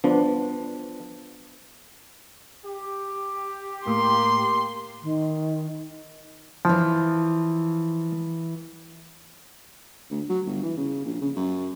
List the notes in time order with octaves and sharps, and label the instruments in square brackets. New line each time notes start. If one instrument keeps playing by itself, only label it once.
[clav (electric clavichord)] F3 [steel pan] B3 D4
[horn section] G4
[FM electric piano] A2 [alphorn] A#3 [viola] C6
[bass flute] D#3
[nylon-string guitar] E3 E4 [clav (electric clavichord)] F3
[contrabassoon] D2
F#3
G1
E3
C#3
A#1
C#3
F#2